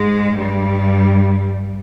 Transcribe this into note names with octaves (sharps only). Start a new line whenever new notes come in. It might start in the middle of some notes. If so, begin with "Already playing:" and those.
Already playing: G#2 G#3
G2 G3